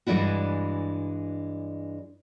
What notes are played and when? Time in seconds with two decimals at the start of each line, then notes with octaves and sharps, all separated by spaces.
0.07 G2 E3 G#3 D4 E4 F#4